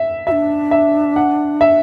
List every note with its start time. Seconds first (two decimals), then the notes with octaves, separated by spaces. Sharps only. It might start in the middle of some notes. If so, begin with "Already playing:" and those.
Already playing: E5
0.27 F#4 E5
0.32 D4
0.71 E5
1.16 F#5
1.61 E5